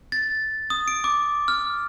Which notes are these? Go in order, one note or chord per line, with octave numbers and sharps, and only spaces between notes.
A6
D#6
D7
D6
F6